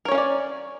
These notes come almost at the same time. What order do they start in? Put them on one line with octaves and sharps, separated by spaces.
A#4 C#5 C#4 F5 D5